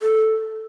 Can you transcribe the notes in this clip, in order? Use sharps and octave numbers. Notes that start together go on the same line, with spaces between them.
A4